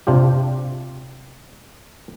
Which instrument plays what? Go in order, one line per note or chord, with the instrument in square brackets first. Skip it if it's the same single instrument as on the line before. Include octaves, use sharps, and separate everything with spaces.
[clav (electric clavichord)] C3 D4 F4 G4